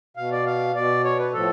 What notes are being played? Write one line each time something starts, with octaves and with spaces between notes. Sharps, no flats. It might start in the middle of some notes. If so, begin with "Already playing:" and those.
B2 F5
D5
F5
B2 D5
C#5
B4
A2 F3 A4